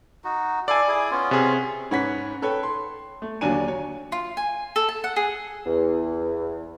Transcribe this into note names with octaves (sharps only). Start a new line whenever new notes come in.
D#4 F#4
E4 A4 D5 F5 G#5
E4 G#4
B3 C#4 F4
C3 G#4
G#2 C#4 B4 F#5 G#6 B6
A4 B4 C#5 G5
C6
A3
D#2 D3 F#3 D4 G#5 D#7
C#5
F4
G#5
A4
A5
F#5
G#4
E2